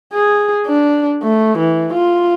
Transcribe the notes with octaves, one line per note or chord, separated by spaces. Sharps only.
G#4
D4
A3
E3
F4